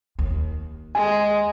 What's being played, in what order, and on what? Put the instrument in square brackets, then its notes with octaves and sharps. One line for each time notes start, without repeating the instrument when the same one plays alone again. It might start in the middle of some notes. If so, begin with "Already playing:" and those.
[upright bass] D#2
[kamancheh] G#3 [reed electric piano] G#5